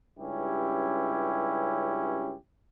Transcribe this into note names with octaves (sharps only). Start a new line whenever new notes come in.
C#2 G2 C#4 E4 G4